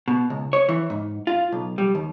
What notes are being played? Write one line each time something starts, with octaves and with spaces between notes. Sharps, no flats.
B2
C#2
C#5
E3
G#2
F4
B1
G3
D#2